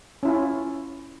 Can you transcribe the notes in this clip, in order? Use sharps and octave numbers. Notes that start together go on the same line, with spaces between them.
C#4 E4 F4